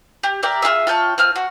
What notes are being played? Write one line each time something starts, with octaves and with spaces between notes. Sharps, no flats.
G4
G4 A#4 D5 E5
F4 G4 G#4 E5
F4 C#5 G5 A5
C4 F4 F6
F#4